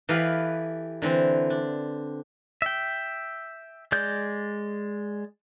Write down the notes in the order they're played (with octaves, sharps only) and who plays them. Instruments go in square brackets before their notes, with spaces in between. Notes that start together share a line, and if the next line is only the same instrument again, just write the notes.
[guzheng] E3 G4 A4 B4 D#5 F5
D3 E3 C4
D4
[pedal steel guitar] E5 G5
G#3 D5 G6